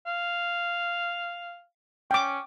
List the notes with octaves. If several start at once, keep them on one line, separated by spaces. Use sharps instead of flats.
F5
C#4 G5 D6